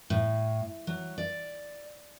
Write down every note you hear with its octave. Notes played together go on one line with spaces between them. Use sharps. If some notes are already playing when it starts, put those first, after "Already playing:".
A2
F#3
D5